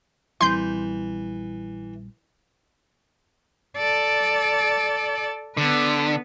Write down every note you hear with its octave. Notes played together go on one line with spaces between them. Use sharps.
A#1 E3 G3 C4 C6 G6
A4 D5
D3 B3 B4